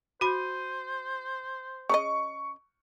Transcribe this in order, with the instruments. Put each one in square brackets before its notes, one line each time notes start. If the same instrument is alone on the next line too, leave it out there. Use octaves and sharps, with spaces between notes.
[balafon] F#4 B5 [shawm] C5 [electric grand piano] D#7
[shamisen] C#3 D#4 D#5 [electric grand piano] C#6